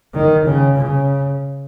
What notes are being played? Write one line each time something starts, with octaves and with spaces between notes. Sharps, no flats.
D#3
C#3
C#3